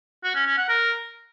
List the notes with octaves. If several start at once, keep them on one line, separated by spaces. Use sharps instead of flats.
F#4
C#4
C#4
F#5
A#4